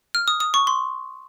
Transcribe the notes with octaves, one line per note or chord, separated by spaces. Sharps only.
F6
D#6
D#6
C#6
C6